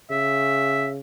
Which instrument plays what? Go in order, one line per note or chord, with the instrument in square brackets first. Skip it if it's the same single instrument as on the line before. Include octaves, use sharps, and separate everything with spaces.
[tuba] C#3 [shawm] E5